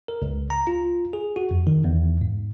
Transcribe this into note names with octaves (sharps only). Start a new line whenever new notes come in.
A#4
C#2
A#5
F4
G#4
F#4
F2
D#3
E2
G#2